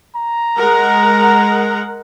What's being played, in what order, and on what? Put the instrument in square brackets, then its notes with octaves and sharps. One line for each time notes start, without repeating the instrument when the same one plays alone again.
[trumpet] A#5
[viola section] G#3 A#4 F#5